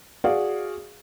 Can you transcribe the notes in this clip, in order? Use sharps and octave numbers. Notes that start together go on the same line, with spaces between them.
F#4 G#4 D5 F5